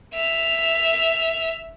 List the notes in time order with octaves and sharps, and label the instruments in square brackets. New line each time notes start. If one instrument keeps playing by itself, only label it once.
[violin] E5 F7